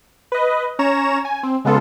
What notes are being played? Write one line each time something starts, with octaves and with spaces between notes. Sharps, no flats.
B4 D#5
C#4 C#5 A#5 E7
G#5
C4
C#3 G#3 B3 F4 A4